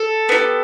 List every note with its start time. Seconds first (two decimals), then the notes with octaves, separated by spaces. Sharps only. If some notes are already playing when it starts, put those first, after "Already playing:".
Already playing: A4
0.29 B3 D#4 G4